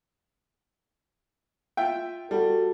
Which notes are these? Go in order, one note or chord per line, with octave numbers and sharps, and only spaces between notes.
F4 E5 G5
G3 F#4 A4